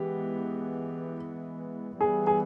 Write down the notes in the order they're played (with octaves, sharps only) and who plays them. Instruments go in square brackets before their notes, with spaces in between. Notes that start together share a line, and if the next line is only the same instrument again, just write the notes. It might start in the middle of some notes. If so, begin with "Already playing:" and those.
Already playing: [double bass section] E3 G#3 B3 [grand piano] G4
[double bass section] E3 G3 B3 [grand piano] G#4
[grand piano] G#4